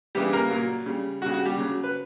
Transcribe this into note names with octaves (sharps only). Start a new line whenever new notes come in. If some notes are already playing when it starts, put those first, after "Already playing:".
C#3 E3 G3 G4
A#3 A#4
A#2 F#3
C#3 G3
C#3 G3 F#4
F#4
G3 G4
C#3 F#3
B4